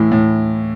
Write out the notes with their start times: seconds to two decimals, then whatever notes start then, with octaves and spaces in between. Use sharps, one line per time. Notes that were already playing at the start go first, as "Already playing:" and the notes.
Already playing: A2 E3
0.12 A2